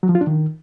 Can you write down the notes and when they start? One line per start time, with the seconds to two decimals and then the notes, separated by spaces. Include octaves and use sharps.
0.03 F#3
0.09 F3
0.15 F4
0.21 D4
0.27 D#3